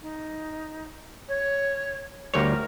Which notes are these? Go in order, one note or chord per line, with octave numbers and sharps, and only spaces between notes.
D#4
C#5
D2 G3 A#4 C#5